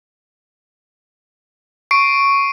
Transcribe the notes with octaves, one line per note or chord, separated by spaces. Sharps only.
C#6 C7 D7